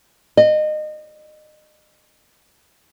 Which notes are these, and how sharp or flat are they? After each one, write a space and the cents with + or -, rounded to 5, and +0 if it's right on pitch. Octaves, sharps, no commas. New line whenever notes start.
D#5 -30